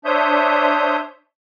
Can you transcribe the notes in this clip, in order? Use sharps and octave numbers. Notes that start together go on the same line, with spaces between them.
D4 C5 C#5 E5 D#6 G6